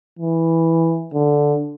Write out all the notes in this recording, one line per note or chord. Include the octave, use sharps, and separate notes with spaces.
E3
D3